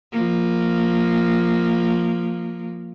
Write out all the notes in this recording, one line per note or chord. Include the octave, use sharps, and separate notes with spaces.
F3 A#3